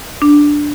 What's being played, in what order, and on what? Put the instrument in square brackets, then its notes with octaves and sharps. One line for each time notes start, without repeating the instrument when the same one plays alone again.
[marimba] D4